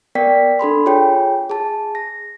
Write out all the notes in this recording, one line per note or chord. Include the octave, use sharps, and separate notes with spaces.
B3 A#4 D5 G5 B6
D4 A4 B5 C6
F4 G#4 C#5 G5
G#4 A5
A#6